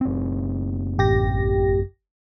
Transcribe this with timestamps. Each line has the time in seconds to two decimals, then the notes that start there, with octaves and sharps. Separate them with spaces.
0.01 F#1 C4
0.98 A1 G4 A#6